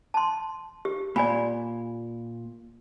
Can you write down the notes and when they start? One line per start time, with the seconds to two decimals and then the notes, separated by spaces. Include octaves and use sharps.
0.14 A5 C6
0.85 G4
1.16 A#2 D5 G#5 B5